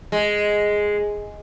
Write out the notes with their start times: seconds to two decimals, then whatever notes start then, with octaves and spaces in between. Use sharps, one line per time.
0.12 G#3